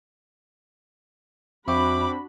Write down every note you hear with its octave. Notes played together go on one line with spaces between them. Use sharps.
F2 C4 D4 F#4 E5 B5 C#6 D6